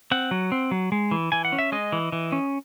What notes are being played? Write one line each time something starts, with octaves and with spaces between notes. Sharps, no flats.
C4 F#5
F#3
C4
F#3
G#3
E3
E3 G#5
F#5
C#4
E5
G#3 D#5
E3
E3
C#4